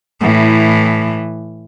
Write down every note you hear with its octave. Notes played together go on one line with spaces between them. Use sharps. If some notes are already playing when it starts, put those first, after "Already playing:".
A2 E3